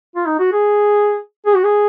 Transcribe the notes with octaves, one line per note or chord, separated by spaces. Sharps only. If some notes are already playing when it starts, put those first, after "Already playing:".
F4
D#4
F#4
G#4
G#4
F#4
G#4